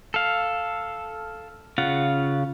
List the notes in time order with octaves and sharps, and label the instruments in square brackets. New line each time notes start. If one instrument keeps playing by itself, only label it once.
[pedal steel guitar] A4 F5
C#3 F4 F#5